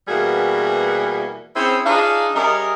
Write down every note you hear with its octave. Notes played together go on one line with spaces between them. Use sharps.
B2 E3 G3 A#3 F#4 G#4
C4 C#4 E4 G#4 C5
D4 D#4 F4 G#4 B4 F5
G3 C#4 G#4 A#4 D#5 E5